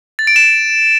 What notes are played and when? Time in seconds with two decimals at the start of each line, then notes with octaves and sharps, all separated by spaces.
0.19 A6
0.27 D7
0.36 E7